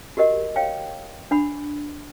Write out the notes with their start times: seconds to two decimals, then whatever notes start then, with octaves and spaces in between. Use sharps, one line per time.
0.17 F#4 G4 A#4 D#5 F#5
0.56 C#5 F5 G5
1.31 D4 F#5 B5